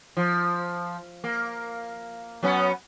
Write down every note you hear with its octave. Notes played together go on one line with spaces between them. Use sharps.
F3
A#3
F#3 B3 C#4